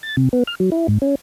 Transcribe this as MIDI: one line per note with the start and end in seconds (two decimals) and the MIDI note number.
0.03 0.16 93
0.17 0.29 48
0.33 0.43 59
0.47 0.55 89
0.60 0.70 54
0.72 0.87 64
0.88 0.98 44
1.02 1.15 61